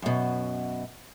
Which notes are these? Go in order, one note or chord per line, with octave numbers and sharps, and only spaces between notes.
F#2 B2